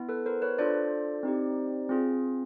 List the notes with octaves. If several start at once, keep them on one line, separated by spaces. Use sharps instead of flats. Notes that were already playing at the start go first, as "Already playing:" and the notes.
Already playing: B3 E4
A4 B4
A#4 C5
B4 C#5
D4 F4 A4 C5 D5
C4 D#4 G4
C4 F4 G#4